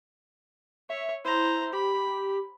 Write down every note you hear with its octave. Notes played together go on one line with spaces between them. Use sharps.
C#5 E5
E4 C5 A#5
G4 B5